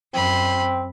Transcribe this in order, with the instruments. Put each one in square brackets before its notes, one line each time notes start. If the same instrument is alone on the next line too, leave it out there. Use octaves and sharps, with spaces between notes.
[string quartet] F#2 B5 C6 [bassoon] C4